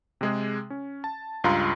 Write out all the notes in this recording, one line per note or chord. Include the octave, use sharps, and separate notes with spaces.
C3 G#3 G#4
C#4
A5
C#2 G2 F4 F5 A#5 C6